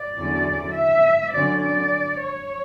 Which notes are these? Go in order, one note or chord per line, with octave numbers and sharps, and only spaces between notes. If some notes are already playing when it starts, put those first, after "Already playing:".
Already playing: D5
E2 D3 F#3 C#4
E5
D3 F#3 C#4 D5
D5
C#5